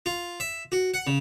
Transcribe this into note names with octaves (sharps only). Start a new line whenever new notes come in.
F4
E5
F#4
F#5
C#3